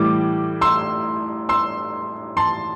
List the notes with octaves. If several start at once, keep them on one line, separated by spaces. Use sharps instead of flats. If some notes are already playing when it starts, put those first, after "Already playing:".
Already playing: A2 E3 G3 D6
C6 E6
C6 E6
A5 C6